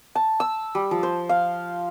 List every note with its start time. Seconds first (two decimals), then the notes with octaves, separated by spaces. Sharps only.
0.15 A5
0.40 E6
0.75 G3
0.91 F3
1.03 C5
1.29 F5